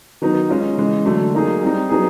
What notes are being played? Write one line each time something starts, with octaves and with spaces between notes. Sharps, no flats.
D#3 F#3 B3 D#4
G#3 C#4 F4
C#3 E3 G#3
D3 F#3 A3
F#3 A#3 D#4 G#4
G3 C4 D#4
F#3 B3 D#4 G#4